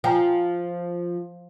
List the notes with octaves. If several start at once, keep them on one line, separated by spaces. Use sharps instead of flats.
F3 G5 G#5 A#5